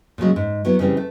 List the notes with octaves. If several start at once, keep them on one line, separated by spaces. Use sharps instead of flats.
A#2 C#3 F#3 G#3
G#2
F#3 B3 E4
C#3 E3 G3 C4
A3